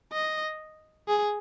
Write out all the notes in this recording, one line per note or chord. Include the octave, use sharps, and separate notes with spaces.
D#5
G#4